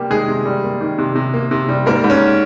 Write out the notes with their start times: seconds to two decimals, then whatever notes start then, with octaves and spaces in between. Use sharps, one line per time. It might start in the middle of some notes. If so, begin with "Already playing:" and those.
Already playing: C3 G3 A#3 G4
0.10 D#3 G#3 G#4
0.28 C3
0.46 G3
0.64 A#3
0.81 D#3
0.99 C3
1.15 C3
1.34 A#3
1.51 C3
1.69 G3
1.86 G#2 A#3 A#4
2.04 G#2
2.10 C#4